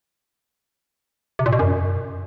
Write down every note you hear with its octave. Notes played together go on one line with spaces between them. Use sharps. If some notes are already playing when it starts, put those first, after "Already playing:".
C3
A#2
B2
F#2